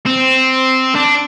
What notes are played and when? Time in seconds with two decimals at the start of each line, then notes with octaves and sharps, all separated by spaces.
0.06 C4
0.95 D4